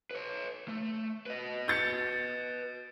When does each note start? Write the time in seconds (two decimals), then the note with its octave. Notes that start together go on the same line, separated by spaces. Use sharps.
0.11 B4 C#5
0.68 A3
1.26 B4 D#5
1.68 G6 A6 C#7